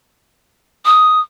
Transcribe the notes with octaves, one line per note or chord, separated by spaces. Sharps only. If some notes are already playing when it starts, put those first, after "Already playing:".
D#6